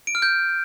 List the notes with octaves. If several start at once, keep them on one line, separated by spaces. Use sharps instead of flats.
D7
F6
G6